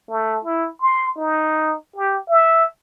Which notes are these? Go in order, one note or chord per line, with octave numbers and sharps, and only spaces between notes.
A3
E4
C6
D#4
G4
E5